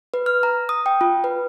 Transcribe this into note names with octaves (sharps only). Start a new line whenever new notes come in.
B4
F6
A#5
D#6
G5
F4
B4